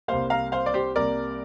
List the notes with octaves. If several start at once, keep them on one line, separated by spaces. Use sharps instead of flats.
C2 C3 G3 A#3 C5 F5
F5 A#5
C5 F5
D5
G4 C5
C2 C3 G3 A#3 A#4 D5